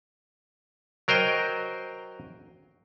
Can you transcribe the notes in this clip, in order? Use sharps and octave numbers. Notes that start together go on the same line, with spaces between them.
F#3 A#4 C5 D#5 G5